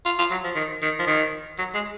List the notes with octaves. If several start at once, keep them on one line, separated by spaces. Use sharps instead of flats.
F4
F4
F#3
F3
D#3
D#3
F3
D#3
F#3
G#3